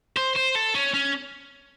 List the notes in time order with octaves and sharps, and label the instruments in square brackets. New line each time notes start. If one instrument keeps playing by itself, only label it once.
[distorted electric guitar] C5
C5
A4
C#4
C#4